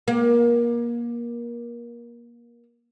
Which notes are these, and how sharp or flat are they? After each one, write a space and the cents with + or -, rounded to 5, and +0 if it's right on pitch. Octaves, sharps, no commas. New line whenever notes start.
A#3 +25